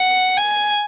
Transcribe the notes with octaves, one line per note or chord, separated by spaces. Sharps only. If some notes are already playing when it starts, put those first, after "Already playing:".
Already playing: F#5
G#5